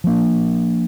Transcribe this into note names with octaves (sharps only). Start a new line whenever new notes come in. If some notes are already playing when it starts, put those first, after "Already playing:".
F3 A#3 D4